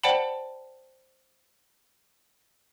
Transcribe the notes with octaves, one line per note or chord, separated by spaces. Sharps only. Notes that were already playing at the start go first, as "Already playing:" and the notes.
C5 D5 F#5 G5 A5 B5